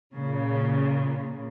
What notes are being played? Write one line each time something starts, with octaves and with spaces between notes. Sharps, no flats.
A#2 C#3